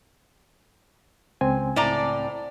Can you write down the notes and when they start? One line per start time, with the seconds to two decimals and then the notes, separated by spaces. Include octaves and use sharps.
1.41 C#2 C4 G#5
1.76 A2 D5 A#5